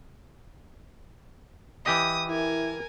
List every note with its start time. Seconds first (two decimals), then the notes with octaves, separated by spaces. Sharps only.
1.86 E3 G4 D#5 D#6
2.28 E4 A#4 G#5